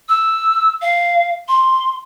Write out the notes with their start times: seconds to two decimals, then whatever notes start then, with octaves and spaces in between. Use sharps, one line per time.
0.09 E6
0.82 F5
1.48 C6